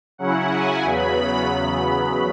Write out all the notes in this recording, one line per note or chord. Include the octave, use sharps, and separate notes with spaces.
C#3 F#3 C#4 E4 F#5
G#5
E2 C#3 F#3 B3 B5